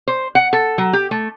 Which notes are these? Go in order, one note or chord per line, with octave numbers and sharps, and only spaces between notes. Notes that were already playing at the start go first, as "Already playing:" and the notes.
C5
F#5
A4
F#3
G4
A3